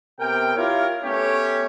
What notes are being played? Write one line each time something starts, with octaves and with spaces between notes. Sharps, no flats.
C3 B3 A#4 G5
E4 F4 G4 A#4 C#5
A3 B3 C#4 G4 C#5